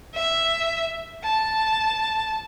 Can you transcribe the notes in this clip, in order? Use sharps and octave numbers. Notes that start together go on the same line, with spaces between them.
E5
A5